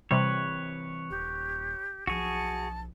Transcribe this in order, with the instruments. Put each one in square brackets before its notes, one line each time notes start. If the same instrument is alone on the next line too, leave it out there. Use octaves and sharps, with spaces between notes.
[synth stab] C3 G3 [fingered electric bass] E3 C4 [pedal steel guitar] B4 C#5
[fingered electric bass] D#1 [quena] G4
[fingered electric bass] B1 F3 [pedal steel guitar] F#4 G#4 [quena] A5